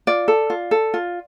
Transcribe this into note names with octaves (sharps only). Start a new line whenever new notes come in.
F4 D5
A4
F4
A4
F4